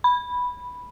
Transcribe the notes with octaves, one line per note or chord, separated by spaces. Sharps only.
B5